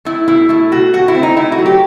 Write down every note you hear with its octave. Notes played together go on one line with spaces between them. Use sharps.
A3 E4
B2 E4
A3 E4
B2 F#4
A3 F#4
E4
C4
D#4
A3 E4
F#4
F#3
G4